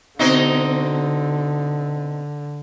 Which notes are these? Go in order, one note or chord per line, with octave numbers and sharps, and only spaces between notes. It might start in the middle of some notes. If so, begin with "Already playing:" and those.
B2 D3 C4 D#4